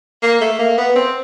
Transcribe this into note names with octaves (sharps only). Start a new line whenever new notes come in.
A#3
A3
A#3
B3
C4